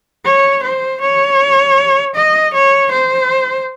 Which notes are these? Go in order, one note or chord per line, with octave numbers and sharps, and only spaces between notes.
C#5
C5
C#5
D#5
C#5
C5